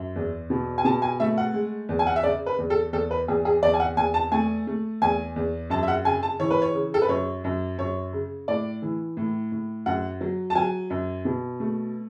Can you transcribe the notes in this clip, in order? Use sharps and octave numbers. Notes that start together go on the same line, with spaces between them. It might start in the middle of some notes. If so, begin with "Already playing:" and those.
Already playing: F#2
E2
B2
G#5
B2 A5
G#5
A3 E5
F#5
G#3
E2
G#5
F#5
E5
C#3 D5
B4
E2
A4
E2 A4
B4
E2 G#4
G#4
E2 D5
G#5
F#5
E2 G#5
A5
A3 G#5
A3
E2 G#5
E2
F#2 A5
E5
F#5
C#3 G#5
A5
E3 C#5
B4
C#5
C#3
A4
B4
F#2 C#5
F#2
F#2 C#5
C#3
A2 D5
E3
A2
A2
F#2 F#5
F#3
A5
F#3 G#5
F#2
B2
A3